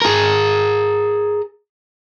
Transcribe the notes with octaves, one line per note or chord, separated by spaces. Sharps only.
G#4 A#4